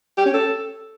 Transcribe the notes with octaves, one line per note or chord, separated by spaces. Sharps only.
G4
C#4
A4